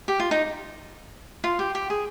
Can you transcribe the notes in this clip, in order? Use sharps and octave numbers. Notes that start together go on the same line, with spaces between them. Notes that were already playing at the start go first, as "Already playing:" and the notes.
G4
F4
D#4
F4
G4
G4
G#4